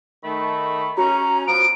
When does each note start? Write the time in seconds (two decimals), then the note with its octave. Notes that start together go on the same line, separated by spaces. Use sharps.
0.24 D#3 A3 B5
0.97 C#4 F#4 A#5
1.47 F3 B3 D7